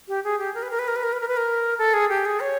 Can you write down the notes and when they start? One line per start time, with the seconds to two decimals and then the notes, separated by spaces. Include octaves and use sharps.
0.08 G4
0.24 G#4
0.39 G4
0.55 A#4
0.62 B4
0.71 A#4
0.79 B4
0.88 A#4
0.96 B4
1.03 A#4
1.13 B4
1.21 A#4
1.28 B4
1.37 A#4
1.78 A4
1.94 G#4
2.09 G4
2.25 G#4
2.40 C#5